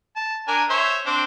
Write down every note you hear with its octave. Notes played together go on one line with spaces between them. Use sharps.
A5
D4 A#4 G#5
C5 C#5 E5
C4 D4 C5